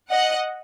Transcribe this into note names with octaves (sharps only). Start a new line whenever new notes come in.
D#5 F#5